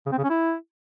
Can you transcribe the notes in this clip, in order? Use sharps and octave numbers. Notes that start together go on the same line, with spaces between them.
C#3
C4
C#3
C#4
E4